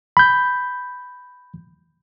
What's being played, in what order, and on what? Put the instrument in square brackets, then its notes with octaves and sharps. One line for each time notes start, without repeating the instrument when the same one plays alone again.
[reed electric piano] B5 G6